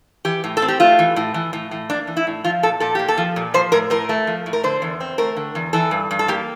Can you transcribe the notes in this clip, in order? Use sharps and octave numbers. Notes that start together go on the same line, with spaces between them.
E3 G4
A2
A4
C4
G4
A3 F4
E3
A2
E3
A2
A2
A#3 D4
E3
E4
A2
F3 F4
A#2 A4
A#2 A4
A#3 G4
A4
F3
A#2
F3 C5
A2 A#4
A2 A#4
A3
F3
A2
A#4
D3 C5
E2
C4
A3 A#4
D3
E2
E3 A4
G2
G2
A4
A#3 G4